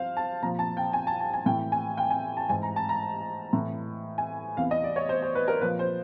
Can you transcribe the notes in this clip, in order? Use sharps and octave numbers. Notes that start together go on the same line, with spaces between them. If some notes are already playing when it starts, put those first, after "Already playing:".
Already playing: F3 C5 F5
A5
A#2 F3 A#5
A5
G5
G#5
A5
A5
G#5
A2 E3 G5
G#5
G5
G#5
A5
G#2 E3 G#5
A#5
A5
A#5
A2 E3
G#5
E2 C3 E3 F5
D#5
D5
C#5
C5
C5
B4
A#4
A#2 F3 B4
C5